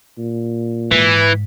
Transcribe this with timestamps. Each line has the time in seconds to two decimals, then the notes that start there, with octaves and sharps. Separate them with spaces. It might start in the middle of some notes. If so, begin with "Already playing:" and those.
0.18 A#2
0.91 G#2 E3